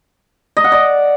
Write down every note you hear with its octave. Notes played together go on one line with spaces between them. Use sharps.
D#5
F#5
D5